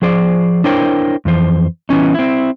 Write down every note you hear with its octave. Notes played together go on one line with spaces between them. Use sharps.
F3 G#4 C5 D5
D4 E4 A#4 C5 C#5 G5
F2 E3 C5
E3 B3 C#4 D#4
C4 E4